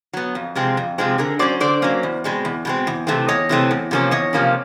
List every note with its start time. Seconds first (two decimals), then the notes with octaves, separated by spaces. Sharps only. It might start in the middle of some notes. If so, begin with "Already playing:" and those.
0.13 F#3 B3
0.35 F2
0.55 C3 F3 G#3 C4
0.77 F2
0.98 C3 F3 G#3 C4
1.18 D3 G#4 A#4
1.39 F#3 A#3 C#4 C5 D5
1.60 D3 C5 D5
1.82 F#3 A#3 C#4
2.03 E2
2.24 B2 G#3 C4
2.45 E2
2.65 B2 G#3 C4
2.87 E2
3.07 C3 E3 A3 C4
3.28 E2 C#5 D#5
3.49 C3 E3 A3 C4
3.71 E2
3.91 C3 F3 A#3 C#4
4.11 E2 C#5 D#5
4.33 C3 F3 A#3 C#4